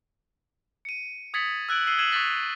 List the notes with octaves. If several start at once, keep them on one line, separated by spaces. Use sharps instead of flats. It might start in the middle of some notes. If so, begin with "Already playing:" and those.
C#7 D#7
D#6 G#6 A6 B6 C#7 F#7
E6 F#6 G#6 D7 F#7
E6 C7 D#7 G7
G#6 C7 D#7 E7 F#7
C#6 D#6 E6 F#6 A6 B6